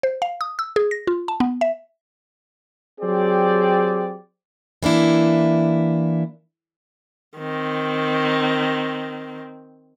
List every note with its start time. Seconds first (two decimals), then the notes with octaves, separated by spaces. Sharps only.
0.03 C5
0.22 F5
0.41 D#6
0.59 E6
0.76 G#4
0.91 A#6
1.07 F4
1.28 A5
1.40 B3
1.61 E5
3.01 F#3 C4 G4 G#4 D5
4.83 E3 A#3 D4 E4
7.38 D#3 C4